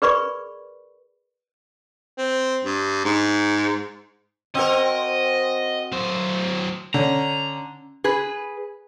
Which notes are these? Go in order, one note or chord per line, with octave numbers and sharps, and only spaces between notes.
G#4 A#4 B4 D5 B5 C#6
C4
G2
G#2
C4 F#4 A#4 D#5
F#3 C5
D3 C#4 A#5
G#4 B4